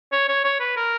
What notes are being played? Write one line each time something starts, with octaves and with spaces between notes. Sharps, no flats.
C#5
C#5
C#5
B4
A#4